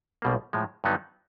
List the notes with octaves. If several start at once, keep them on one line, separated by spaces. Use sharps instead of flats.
B1 B2 G3 A#3
A2 F3 G#3
G2 D3 F#3 B3 D#4